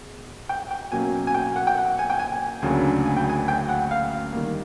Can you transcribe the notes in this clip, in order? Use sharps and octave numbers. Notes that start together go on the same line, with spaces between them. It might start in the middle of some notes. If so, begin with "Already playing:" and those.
Already playing: B2 G#4
G5
G5
B2 F#3 A#3 C#4 G#5
G#5
G5
F#5
G5
F#5
G#5
G5
G#5
D2 C#3 F#3 A#3 D4 G#5
G#5
G5
G#5
G5
F#5
F5
D#3 G3 A#3